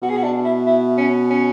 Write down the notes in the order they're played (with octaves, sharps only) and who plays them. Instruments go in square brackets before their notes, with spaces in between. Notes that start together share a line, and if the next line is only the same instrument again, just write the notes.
[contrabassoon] B2 [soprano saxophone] F#4
[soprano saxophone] G#4
F#4
D4
E4
E4
C#4
C#4